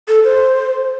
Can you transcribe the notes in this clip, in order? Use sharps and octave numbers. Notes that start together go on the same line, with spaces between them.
A4
C5